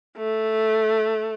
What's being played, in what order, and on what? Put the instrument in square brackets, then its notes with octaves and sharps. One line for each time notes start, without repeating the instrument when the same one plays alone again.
[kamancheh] A3